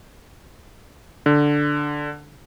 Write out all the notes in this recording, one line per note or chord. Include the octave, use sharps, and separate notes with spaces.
D3